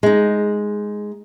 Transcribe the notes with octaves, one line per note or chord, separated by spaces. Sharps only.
G#3 D#4